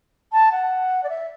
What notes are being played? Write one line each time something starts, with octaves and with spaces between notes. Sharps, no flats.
A5
F#5
D5
E5